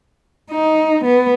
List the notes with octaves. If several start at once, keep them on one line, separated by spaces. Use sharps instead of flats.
D#4
B3